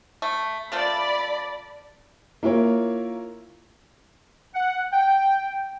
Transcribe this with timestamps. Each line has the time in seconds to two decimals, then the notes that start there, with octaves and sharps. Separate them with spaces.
0.22 A3
0.72 A3 F4 A4 D5 B5
2.43 A#3 E4 F4 A#4 C#5
4.54 F#5
4.92 G5